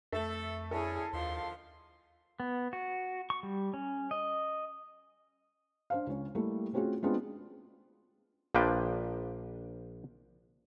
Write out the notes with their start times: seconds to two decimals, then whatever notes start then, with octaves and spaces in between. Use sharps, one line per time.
0.13 F2 A3 A4 E5
0.71 B2 D3 C#4 E4 G#4 A4
1.13 D#2 D3 D#3 F3 F4 C6
2.40 B3
2.73 F#4
3.30 C#6
3.43 G3
3.74 C#4
4.11 D#5
5.90 D4 C5 F5
6.07 C#2 C#4
6.35 G3 A3 A#3 E4 G4 A4
6.73 A3 C4 C#4 F4 F#4 G#4
7.02 G#3 B3 C4 D4 F4 G#4
8.55 A#1 F3 A#3 D4 B4 G5